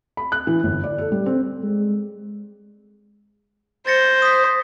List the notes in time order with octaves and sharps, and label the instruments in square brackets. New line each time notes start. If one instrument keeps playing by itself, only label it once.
[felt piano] B5
F#6
E3
G1
D5
A4
G3
C4
[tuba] G#3
[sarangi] C5 [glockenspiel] A6 A#6 C#7
[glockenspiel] D#6 B6